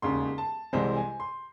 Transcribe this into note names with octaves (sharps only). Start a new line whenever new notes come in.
E1 D#2 C#3 C6
A5
C2 C3 E3 G#3 C5
G#5
C6